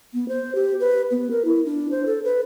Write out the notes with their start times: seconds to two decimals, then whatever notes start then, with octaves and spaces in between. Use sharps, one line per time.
0.14 B3
0.29 C5
0.55 G4
0.80 B4
1.11 B3
1.31 A#4
1.45 E4
1.66 D4
1.91 C5
2.06 A4
2.24 B4